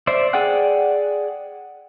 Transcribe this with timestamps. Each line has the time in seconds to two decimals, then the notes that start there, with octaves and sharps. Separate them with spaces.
0.07 C5 D5 E5
0.33 G#4 D5 F#5 G5 F#6